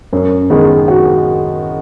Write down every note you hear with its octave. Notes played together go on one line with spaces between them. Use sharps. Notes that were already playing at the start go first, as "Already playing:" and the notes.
F#2
D#3 G#3 B3
F#4